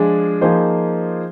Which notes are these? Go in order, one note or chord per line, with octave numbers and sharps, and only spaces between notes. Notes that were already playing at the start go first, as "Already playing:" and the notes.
Already playing: F3 G#3 D4 G#4
F3 A#3 D#4 G#4 C5